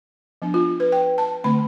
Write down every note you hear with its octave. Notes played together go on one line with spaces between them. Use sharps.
F3 B3 D4
F4
B4
G5
A5
D3 A3 C4 B5